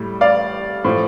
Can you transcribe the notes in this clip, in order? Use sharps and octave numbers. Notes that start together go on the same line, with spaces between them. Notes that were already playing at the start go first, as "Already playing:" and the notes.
Already playing: A2 G3
D5 F5
A2 F3